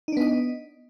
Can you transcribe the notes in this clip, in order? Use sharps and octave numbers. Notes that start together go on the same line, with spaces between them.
B3 D4 D#4 D#5